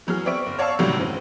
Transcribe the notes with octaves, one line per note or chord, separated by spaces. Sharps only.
E3 F#3 G#4 F6
B3 C4 D5 E5 C#6 D7
F#1
C#5 D5 F5 A5 C#6 E6
G#1 D2 C3 D#3 F#3 G3
F1 E3 C4 C#4